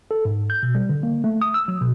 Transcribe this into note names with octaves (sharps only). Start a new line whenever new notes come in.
A4
G#2
G6
B2
G3
D3
A#3
A3
D#6
E6
F#3
B2